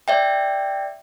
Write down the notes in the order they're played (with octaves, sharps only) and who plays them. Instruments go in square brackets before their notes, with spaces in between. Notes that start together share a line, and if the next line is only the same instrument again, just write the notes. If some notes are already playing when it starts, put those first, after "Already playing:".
[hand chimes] D5 E5 G5